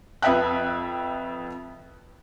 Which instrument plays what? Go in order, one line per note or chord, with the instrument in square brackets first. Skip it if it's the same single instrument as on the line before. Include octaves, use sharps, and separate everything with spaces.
[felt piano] F2 B4 E5 G5 F#6